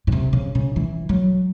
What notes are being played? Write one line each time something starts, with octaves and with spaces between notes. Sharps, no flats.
A2
C3
C#3
C#3
E3
F#3